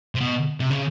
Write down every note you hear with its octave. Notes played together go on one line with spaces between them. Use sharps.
C3
B2
C3
C#3